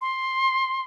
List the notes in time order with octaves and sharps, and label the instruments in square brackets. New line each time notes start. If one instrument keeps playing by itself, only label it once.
[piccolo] C6